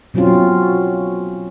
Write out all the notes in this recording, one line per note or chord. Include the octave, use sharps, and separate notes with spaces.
B2 F#3 C4 C#4 F4